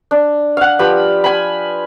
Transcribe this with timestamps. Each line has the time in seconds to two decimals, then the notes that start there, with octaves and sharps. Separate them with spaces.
0.11 D4
0.57 F5 F#5
0.79 F3 G4 B4 B5
1.24 G#5 B5